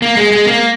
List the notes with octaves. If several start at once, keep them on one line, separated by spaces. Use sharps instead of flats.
A#3
G#3
G#3
A#3